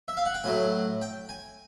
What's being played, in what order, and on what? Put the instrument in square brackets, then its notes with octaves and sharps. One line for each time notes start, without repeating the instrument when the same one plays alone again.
[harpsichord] E5
F5
F#5
G5
A2 F#3 A3 G#5
G5
G#5